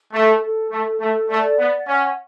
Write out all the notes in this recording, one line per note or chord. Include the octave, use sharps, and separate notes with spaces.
A3 A4
A4
A3 A4
A3 A4
A3 D5
B3 F#5
C#4 F#5